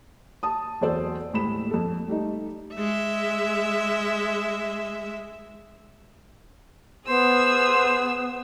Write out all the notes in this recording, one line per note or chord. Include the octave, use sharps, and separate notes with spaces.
A5 D#6
E2 F#3 A4 C5 D5 E6
D#1 A2 G#3 B5 E7
F2 A4
G3 A3 D#4
G#3 E5
B3 G#4 C5 E6